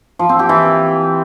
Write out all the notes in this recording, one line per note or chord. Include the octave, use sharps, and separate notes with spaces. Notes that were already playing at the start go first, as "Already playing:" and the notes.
F3
C4
G4
E3